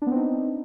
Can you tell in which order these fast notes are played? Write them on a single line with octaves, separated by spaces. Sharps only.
D4 B3 C4 D#4